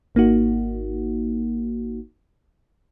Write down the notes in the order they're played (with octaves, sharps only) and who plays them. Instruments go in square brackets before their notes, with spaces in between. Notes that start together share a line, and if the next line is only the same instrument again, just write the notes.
[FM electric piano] G#1 A#3 D#4 F#4